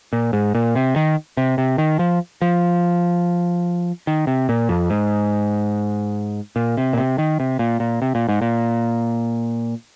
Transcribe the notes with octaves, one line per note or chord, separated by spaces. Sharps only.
A#2
G#2
A#2
C3
D#3
C3
C3
D#3
F3
F3
D#3
C3
A#2
F2
G#2
A#2
C3
A#2
C3
D#3
C3
A#2
A#2
C3
A#2
G#2
A#2